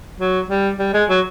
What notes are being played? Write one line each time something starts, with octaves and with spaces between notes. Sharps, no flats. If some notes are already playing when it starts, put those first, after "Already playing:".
F#3
G3
G3
G#3
F#3